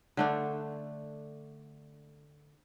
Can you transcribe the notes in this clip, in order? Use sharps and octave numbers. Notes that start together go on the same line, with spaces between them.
D3 A3 D4